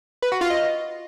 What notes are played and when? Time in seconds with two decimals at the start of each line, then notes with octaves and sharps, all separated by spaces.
0.22 B4
0.32 F#4
0.41 F4
0.50 D#5